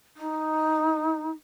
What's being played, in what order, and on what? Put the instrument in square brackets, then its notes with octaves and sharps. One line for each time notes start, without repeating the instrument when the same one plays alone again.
[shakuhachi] D#4